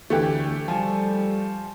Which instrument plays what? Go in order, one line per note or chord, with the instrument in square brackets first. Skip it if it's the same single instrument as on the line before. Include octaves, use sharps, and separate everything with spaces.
[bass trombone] D2 [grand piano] D3 E3 [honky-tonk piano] A3 G4
[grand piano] F3 G#5 [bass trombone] G3